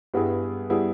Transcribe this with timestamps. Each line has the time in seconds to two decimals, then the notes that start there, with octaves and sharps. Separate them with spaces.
0.14 G2 G3 B3 E4 G#4
0.70 G3 B3 E4 G#4